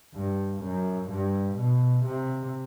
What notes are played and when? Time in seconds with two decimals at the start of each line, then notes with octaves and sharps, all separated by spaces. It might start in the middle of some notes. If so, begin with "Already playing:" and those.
0.14 G2
0.61 F#2
1.09 G2
1.56 B2
2.04 C3